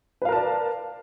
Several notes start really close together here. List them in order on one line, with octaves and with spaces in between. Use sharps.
B4 F5 A#4 A5 D5